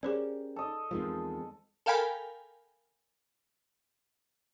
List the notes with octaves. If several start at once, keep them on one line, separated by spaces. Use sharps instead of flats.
C#4 G4 G#4 A#4 C5 D5
A4 D#5
E2 D#3 F3 G#3 C4
A4 A#4 F5 G5 G#5 B5